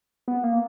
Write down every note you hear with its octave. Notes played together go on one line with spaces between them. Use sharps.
B3
A#3